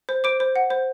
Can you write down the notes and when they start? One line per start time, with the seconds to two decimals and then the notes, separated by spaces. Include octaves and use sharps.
0.09 C5
0.24 C5 D6 D7
0.40 C5
0.56 F#5
0.70 C5